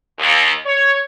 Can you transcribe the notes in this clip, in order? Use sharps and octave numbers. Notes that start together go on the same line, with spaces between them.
D#2
C#5